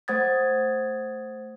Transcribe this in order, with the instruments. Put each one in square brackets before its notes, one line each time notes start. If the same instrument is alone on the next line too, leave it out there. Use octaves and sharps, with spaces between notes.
[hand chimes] A3 C5 F#5 D#6 G#6 A6